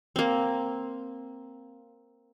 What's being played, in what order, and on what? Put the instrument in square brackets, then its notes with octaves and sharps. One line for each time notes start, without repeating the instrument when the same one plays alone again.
[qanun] A#3 C4